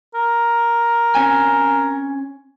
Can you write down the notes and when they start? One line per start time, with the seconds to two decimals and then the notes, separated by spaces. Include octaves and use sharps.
0.15 A#4
1.15 C4 C#4 G#5